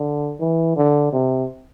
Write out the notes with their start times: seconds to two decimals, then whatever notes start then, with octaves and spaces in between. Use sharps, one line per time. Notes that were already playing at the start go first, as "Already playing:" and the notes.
Already playing: D3
0.40 E3
0.76 D3
1.13 C3